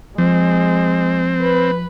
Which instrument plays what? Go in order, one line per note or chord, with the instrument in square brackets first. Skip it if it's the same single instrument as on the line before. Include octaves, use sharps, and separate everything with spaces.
[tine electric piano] F3 [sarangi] G#3 [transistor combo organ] C4
[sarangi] B4